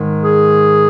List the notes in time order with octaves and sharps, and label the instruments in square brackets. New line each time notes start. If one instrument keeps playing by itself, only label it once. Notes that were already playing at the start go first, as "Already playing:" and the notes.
Already playing: [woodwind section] G#2 D#3 G#3
G#4